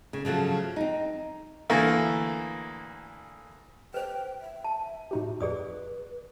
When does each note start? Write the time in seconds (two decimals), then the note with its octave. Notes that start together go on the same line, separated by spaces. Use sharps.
0.13 C#3
0.25 C#3 F3 F#3 A3
0.76 C4 D#4
1.70 D2 E3 A3 A#3
3.94 B4 C5 G5
4.41 E5
4.64 A5
5.11 A2 D#4 F#4 G4
5.41 F2 G#4 B4 D5 D#6